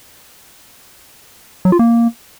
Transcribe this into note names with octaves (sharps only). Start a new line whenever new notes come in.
F#3
F4
A#3